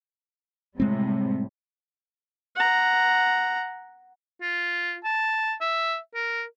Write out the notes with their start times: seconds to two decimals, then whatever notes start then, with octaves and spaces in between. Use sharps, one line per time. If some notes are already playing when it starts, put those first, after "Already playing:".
0.80 A2 C3 G3 G#3 C4
2.56 F#5 A#5
4.42 F4
5.04 A5
5.61 E5
6.15 A#4